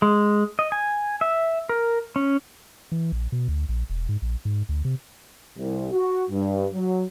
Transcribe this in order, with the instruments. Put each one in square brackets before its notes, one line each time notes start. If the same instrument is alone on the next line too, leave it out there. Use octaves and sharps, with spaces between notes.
[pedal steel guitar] G#3
D#5
G#5
E5
A#4
C#4
[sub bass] E3
A#1
B2
D2
A#1
E1
G#2
A#1
G#2
D2
C3
[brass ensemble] C2
F#4
G2
F#3